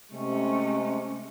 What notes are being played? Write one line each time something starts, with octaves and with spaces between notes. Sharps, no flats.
C3 G#3 A3 C#4